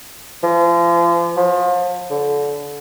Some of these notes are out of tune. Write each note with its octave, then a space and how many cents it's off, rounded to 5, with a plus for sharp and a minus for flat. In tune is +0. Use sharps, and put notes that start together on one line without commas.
F3 -35
F3 +35
D3 -25